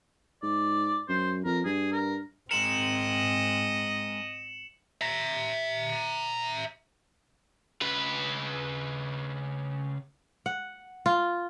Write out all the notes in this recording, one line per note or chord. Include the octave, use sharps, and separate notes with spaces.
G#2 D5
F#2 C5
F2 A#4
G2 G#4
A#4
G#2 G#3 C4 A#4 D#5 C#7 E7 F#7
E5 A#5
C#3 B4
F#5
F4